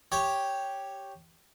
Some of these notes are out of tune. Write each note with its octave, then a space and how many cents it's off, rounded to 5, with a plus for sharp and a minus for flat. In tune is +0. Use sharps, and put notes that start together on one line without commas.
G4 +0 C#5 +0